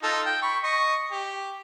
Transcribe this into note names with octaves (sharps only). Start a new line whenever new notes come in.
D#4 F4 A4
G5
B5 C#6
D#5 C#6
G4